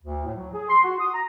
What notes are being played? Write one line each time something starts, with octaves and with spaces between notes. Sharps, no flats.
D2
A2
F#3
G#4
C6
F#4
D#6
A#5